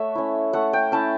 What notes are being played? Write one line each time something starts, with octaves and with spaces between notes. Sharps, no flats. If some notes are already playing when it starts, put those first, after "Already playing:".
Already playing: A3 C#5 E5 F#5
C#4 E4
A3 F#5
G5
C#4 E4 A5